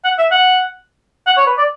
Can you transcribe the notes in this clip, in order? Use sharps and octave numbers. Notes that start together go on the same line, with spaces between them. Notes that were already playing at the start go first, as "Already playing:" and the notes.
F#5
E5
F#5
F#5
C#5
B4
D5